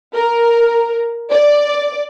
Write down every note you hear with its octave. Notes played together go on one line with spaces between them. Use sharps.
A#4
D5